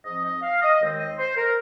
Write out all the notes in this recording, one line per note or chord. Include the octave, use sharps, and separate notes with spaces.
G#2 F3 C4 D#5
D#5
F5
D#5
D#2 D#3 G#3 C4
D#5
C5
A#4